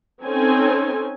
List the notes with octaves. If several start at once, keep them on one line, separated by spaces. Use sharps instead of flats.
C4 C#4 D#4 A4 G#5